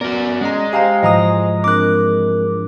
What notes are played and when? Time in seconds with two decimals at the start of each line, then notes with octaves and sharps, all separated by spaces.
0.01 B3 F#4 A#4 D5
0.41 G#3 C#4 D#5 A#5
0.73 G4 C5 D#5 F5 G5 G#5 A#5
1.03 G#2 E3 F3 D#5 A#5 D#6
1.64 C4 D4 A#4 D6 F#6